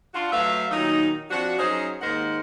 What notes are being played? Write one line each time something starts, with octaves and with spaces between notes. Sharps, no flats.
D4 F4 F#4
F#3 A3 B4 E5 F5
A#2 D#3 F#3 D#4
F3 C4 D4 F#4
F#3 C#4 D#4 G#4 C5
D#2 G#2 A#4 C5 D#5 F#5